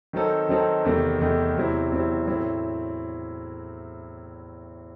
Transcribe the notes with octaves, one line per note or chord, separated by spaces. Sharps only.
D#3 F#3 C4 D#4 A4
D#3 F#3 C4 D#4 A4
E2 C3 D#3 A3
E2 C3 D#3 A3
E2 C3 F#3 C4 E4
E2 C3 F#3 C4 E4
A2 F#3 C4 E4